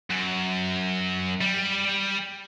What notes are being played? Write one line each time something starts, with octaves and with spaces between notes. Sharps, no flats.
F#2
G3